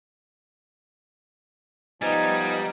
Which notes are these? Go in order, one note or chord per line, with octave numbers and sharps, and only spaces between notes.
F3 G3 B3 D#4 G#5